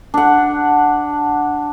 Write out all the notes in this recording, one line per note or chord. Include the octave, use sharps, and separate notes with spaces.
D4 F#5